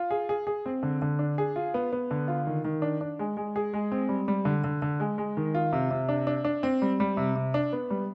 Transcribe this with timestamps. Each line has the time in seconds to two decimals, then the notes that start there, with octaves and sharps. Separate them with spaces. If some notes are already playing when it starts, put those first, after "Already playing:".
Already playing: F4
0.11 G#4
0.29 G#4
0.47 G#4
0.66 C4
0.83 D3
1.02 D3
1.19 D4
1.38 G#4
1.56 F4
1.74 B3
1.93 B3
2.11 D3
2.28 F4
2.47 D#3
2.64 D#3
2.82 D4
3.01 D4
3.19 G#3
3.37 G#3
3.56 G#4
3.73 G#3
3.92 C4
4.09 G3
4.28 G3
4.45 D3
4.64 D3
4.82 D3
5.00 G#3
5.18 G#3
5.37 D#3
5.55 F4
5.72 C3
5.91 C3
6.09 D4
6.27 D4
6.45 D4
6.63 C4
6.82 G3
7.00 G3
7.17 C3
7.36 C3
7.54 D4
7.73 B3
7.90 G3